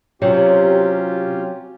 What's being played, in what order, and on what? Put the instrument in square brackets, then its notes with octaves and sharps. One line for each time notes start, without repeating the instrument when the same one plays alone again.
[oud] C3 [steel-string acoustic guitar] F#3 [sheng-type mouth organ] C#4 F4 G4